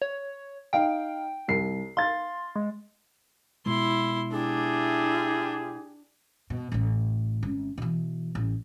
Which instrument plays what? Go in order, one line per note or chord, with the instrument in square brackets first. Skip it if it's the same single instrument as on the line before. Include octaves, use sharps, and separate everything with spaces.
[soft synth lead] C#5
[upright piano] D#4 F5 D7 [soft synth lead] G5
[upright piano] C2 C7
[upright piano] F5 A6 [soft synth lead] C6
[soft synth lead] G#3
[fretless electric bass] B2 G#3 [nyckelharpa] E4 C6
[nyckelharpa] D4 [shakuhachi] E4 [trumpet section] G4 G#4
[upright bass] B2
A1 A2
G#1 C#4
B2 E3
A1